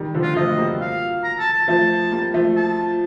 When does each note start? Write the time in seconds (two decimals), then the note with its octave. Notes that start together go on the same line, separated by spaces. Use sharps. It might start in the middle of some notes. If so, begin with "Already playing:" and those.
Already playing: D#3 G3
0.14 D3 F3
0.22 F4
0.37 F3 A3 D#5
0.58 G3 A#3
0.81 F5
1.24 A#5
1.39 A5
1.53 A5
1.68 F3 A3 A5
2.12 G3 A#3
2.34 F3 A3
2.56 A5